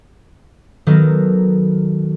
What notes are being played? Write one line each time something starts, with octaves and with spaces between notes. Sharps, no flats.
D#3 F#3 B3 A4 A#4